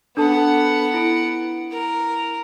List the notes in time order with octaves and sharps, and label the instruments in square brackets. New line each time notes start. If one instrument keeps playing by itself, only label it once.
[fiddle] B3 F#5 [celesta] D4 A4 A5
[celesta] E4 D7
[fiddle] A#4